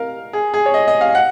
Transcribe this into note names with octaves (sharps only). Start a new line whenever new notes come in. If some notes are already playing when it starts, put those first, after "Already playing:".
Already playing: A#4 F5
G#4
G#4
C#5
D#5
D#5
F5
F#5